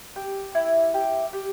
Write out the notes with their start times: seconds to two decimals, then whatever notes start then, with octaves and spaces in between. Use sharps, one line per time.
0.16 G4
0.55 E4
0.94 G4
1.33 G4